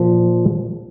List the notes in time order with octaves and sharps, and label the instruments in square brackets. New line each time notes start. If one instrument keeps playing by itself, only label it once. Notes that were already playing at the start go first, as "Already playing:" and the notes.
Already playing: [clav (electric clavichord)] A#2 F3